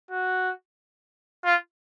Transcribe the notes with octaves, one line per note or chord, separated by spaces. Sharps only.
F#4
F4